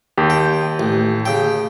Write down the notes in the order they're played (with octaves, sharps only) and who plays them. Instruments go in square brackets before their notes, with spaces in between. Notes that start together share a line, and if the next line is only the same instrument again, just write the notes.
[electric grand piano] D#2 G4
[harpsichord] G5
A1
C#3 G5